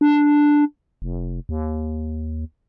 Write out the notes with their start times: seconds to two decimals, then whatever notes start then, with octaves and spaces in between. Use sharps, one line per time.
0.01 D4
1.02 F1
1.49 D#2